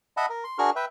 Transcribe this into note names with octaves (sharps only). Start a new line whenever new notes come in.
D#5 E5 F#5 A5 B5
A#4
C6
D4 F#4 G#4 A#4 C#6 F6
B4 E5 G5